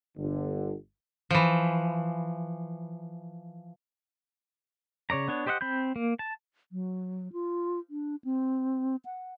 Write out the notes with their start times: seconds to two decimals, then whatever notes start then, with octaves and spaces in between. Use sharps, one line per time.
0.18 G1 D3
1.30 E3 F3
5.10 C#3 C#5 D5 A#5
5.28 B3 D4 C#5
5.46 G4 C5 D#5 E5 F#5
5.61 C4 B5 G6
5.96 A#3
6.19 A5
6.72 F#3
7.33 F4
7.90 D4
8.24 C4
9.05 F#5